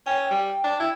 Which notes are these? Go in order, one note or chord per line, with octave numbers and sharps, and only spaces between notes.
C#4 G5
G3
D4
E4